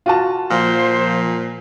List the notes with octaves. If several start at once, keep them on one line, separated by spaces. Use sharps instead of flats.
F4 F#4 A5
A#2 F3 C5